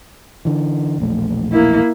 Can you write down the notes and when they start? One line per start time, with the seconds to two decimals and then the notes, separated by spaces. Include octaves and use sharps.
0.45 D3 E3
0.98 E1 A#1 A3
1.52 A#3 E4